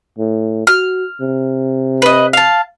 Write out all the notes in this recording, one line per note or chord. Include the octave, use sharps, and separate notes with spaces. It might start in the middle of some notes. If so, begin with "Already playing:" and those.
A2
F#4 F6
C3
B4 D#5
F5 A5